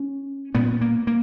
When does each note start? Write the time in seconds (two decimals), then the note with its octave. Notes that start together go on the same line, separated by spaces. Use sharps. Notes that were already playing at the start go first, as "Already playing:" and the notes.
Already playing: C#4
0.55 A#2 B3
0.81 A#3
1.07 A#3